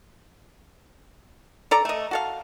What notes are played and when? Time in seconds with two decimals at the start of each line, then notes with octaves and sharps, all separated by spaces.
1.71 A4 D5 A#5
1.85 A3 D#5
2.11 F#4 A4 F5